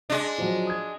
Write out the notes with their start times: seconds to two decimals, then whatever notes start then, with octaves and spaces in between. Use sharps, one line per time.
0.10 G#3 D4
0.38 F3 F#3
0.67 D#6 G#6